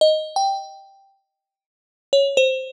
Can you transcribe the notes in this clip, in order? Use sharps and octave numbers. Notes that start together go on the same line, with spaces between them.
D#5
G5
C#5
C5